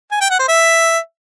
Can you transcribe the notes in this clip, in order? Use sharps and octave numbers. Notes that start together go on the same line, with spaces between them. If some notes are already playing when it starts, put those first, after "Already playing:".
G#5
G5
F#5
C5
E5